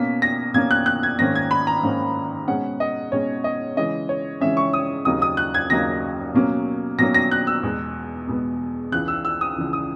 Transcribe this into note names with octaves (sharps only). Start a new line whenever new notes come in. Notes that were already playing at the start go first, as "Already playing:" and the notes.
Already playing: B2 A#3 C#4 B6
A#6
B2 A#3 C#4 G#6
F#6
F#6
G#6
G#2 D#3 A#3 C#4 A#6
G#6
B5
A#5
G#2 D#3 A#3 C#4
B2 G#3 C#4 F#5
D#5
B2 G#3 C#4 C#5
D#5
C#3 E3 G#3 C#4 D#5
C#5
C#3 E3 G#3 C#4 E5
C#6
D#6
D#2 C#3 F#3 A#3 D#4 D#6
D#6
F#6
G#6
D#2 C#3 F#3 A#3 D#4 A#6
B2 F#3 A#3 C#4
B2 F#3 A#3 C#4 A#6
A#6
F#6
E6
E2 B2 G#3 B3
E2 B2 G#3 B3
C#2 C#3 E3 F#6
E6
E6
D#6
C#2 C#3 E3
D#6